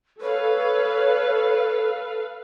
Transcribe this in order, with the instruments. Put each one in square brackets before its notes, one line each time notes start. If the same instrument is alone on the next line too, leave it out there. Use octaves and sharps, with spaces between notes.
[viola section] A4 B4 F5 [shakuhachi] C#5